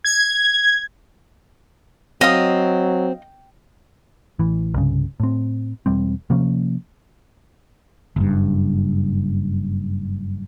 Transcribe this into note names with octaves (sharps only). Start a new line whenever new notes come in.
G#6
F#3 C4 D#5 F5 D#6
A1 E3
C2 G2 C#3
A2 C4
E1 G3 C4
C3 F3 A#3 C#4
F#1 G2